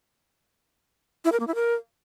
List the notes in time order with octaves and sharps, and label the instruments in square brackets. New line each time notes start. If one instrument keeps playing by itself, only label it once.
[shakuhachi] E4
A#4
A#3
E4
A#4